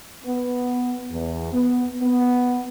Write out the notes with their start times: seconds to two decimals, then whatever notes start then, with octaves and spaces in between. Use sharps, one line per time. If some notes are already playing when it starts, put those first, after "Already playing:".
0.24 B3
1.11 E2
1.52 B3
2.02 B3